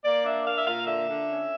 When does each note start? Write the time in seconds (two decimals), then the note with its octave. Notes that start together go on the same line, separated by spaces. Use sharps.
0.03 A#3 D5
0.24 D4 E5
0.45 A#3 F5
0.56 E5
0.65 A#2 F5
0.87 D3 E5
1.08 D3
1.28 C#4